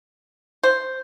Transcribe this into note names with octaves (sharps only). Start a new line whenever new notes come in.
C5